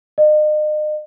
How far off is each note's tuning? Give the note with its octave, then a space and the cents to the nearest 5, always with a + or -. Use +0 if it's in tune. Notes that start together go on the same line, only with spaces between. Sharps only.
D#5 -40